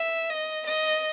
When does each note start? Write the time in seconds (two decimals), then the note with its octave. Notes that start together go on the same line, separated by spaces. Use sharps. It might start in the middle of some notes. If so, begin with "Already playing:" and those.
Already playing: E5
0.30 D#5
0.67 D#5